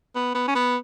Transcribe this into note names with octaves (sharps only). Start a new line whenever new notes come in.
B3
B3
C#4
B3